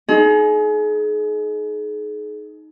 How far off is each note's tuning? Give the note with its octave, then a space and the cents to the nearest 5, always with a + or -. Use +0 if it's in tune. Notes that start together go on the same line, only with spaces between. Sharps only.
D#4 +0 G#4 +35